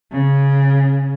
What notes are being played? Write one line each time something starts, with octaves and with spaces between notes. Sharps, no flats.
C#3